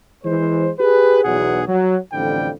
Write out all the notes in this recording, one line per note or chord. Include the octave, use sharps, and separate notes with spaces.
E3 G#3 C5
G4 G#4 B4
B1 E2 F#3 G#4 F#5
F#3
A1 F2 D3 G3 G5